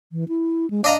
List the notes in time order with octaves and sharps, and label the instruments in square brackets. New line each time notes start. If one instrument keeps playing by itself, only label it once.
[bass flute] E3
E4
G#3
[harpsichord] D4 D#5 A#5 [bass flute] F5